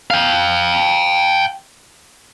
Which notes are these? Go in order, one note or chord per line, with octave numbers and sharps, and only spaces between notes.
F5 G5